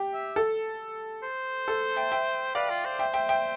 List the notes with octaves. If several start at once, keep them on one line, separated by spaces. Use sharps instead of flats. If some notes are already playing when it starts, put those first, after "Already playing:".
Already playing: G4
E5
A4
C5
A4
E5 G5
E5 G5
B4 D5 F5
F4
C5
E5 G5
E5 G5
E5 G5